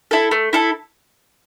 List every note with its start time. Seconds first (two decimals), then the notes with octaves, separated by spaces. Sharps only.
0.11 E4 A4
0.31 A3
0.53 E4 A4